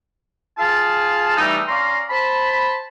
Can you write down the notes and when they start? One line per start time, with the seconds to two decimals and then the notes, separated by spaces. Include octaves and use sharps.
0.58 F4 G#4 F5 A5
1.37 E3 G3 A3 D#4
1.68 C#4 D5 F5 A#5 C6
2.09 C5 A5 B5